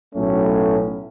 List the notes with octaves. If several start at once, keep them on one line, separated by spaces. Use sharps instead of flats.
B1 A2 F#3 A3 C#4